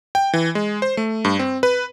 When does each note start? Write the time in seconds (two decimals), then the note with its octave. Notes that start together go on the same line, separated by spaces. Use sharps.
0.15 G5
0.33 E3
0.55 G#3
0.82 C5
0.97 A3
1.25 G2
1.39 C4
1.63 B4